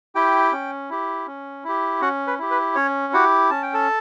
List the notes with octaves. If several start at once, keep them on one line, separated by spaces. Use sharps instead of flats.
E4 G4 G5
C#4
E4 G4
C#4
E4 G4
C#4 F#4 F#5
B4
E4 G4
B4
C#4 C#5
E4 F#4 G4 F#5
C#4 A5
G5
A4 A5